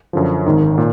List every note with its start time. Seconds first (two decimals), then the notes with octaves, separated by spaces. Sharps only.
0.13 F#2 D3 F3
0.46 G#1 G#2 D#3
0.78 A#2